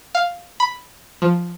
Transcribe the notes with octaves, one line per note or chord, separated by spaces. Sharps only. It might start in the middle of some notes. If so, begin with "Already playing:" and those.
F5
B5
F3